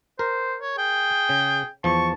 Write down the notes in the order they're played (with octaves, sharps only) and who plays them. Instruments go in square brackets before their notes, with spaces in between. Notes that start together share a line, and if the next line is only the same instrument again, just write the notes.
[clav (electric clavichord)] A#4 [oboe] C5
[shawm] C#5
[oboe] G#4 [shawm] G5
[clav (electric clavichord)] C#3
[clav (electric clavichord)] E2 F3 [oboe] A5 [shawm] C#6